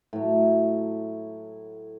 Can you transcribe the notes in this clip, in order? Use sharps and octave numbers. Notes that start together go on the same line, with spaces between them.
A2 F#3